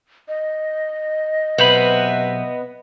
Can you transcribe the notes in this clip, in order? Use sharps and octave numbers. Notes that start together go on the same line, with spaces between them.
D#5
B1 C3 B3 B4 C5 E5 B5